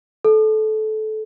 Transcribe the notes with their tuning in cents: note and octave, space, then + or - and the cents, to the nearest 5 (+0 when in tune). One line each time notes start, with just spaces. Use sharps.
A4 -20